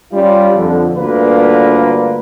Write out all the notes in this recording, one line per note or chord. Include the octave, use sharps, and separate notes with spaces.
G3 C#4 F4
F2 D3
D2 G2 D3 A#3 F4 B4